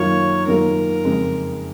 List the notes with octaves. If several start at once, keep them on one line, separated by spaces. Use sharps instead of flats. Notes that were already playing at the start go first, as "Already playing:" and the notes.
Already playing: F#2 D#3 A#3 F4 C#5
F#2 D#3 A#3 F4 A#4
F2 C#3 G#3 C4